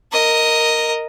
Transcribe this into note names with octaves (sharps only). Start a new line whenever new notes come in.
A#4 D#5